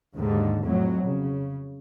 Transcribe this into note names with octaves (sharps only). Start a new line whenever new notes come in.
D#2 G#2 D3
F2 A2 F#3
C#3